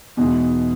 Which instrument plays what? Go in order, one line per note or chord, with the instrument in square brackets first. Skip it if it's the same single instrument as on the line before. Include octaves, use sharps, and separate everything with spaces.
[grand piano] E2 B2 G#3 D#4